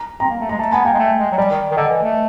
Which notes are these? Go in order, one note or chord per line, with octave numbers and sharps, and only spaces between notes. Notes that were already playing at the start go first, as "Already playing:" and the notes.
Already playing: A#5
C4 A#5
A#3
A3
G#3 A#5
A3 A5
B3 G#5
A#3 G5
G#3
A3
G#3
F#3
G3 D5
D#3
D#3
D3 D#5
E3
A3